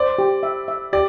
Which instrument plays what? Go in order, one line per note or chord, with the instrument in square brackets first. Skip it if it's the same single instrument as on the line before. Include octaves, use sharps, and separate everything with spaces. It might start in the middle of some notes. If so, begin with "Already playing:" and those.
Already playing: [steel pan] C5 [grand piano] D5
[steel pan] G4
E5
E5
[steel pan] G4 [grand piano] D5